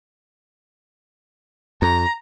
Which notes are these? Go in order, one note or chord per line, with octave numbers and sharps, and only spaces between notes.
F2 A#5